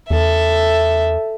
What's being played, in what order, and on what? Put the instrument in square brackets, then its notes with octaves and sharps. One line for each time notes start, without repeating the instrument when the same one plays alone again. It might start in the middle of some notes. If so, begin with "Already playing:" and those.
[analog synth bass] E2 [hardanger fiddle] A4 E5